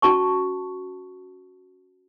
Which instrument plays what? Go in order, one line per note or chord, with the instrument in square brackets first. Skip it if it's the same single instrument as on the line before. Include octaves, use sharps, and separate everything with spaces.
[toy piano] C#4 F#4 A5 C#6